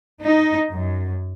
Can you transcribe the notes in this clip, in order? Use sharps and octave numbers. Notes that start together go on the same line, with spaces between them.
D#4
F#2